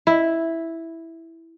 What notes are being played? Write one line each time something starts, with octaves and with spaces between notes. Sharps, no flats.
E4